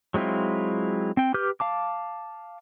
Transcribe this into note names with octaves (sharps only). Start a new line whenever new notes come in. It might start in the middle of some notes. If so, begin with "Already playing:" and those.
F#3 G#3 C4 E4 F4
C4 G5
G4 B4 D6 F6 G6
F5 A5 D6